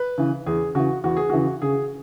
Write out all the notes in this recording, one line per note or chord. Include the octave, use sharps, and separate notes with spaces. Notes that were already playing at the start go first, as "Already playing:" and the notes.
Already playing: B4
C#3 E3
E2 G#4
C#3 E3 F#4
E2 F#4
G#4
C#3 E3 F#4
C#3 G#4